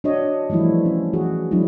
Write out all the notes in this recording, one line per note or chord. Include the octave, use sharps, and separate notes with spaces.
D4 F#4 C#5 D#5
E3 F3 G3 A3 E4
C#4
E3 F#4 G#4
F3 F#3 G#3 D4 E4